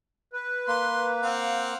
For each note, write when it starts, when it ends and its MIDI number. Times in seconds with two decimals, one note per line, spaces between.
0.33 1.28 71
0.68 1.74 58
0.68 1.07 84
1.22 1.78 60
1.22 1.78 77
1.22 1.78 78